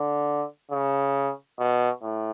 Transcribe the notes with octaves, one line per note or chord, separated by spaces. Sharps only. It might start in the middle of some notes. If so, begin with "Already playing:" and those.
Already playing: D3
C#3
B2
A2